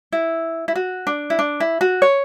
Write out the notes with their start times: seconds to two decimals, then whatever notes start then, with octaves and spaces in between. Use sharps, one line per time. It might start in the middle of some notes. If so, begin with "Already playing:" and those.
0.12 E4
0.68 E4
0.75 F#4
1.07 D4
1.30 E4
1.39 D4
1.60 E4
1.81 F#4
2.02 C#5